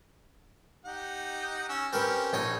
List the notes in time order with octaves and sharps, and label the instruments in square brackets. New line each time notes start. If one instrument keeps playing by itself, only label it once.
[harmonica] D#4 G4 F#5
C#4 E6
[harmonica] C4 C#4 G4 [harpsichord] A#4 B4
[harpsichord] A#1 C#5 G#5 [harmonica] D#4